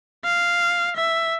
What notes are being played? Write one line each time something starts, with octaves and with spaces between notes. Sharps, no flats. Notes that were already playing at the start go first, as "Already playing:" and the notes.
F5
E5